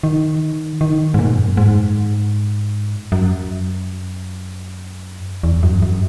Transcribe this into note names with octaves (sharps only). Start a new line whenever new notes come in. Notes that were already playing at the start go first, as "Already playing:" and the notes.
D#3
D#3
G#2
A#2
F#2
G#2
F#2
E2
F#2
F#2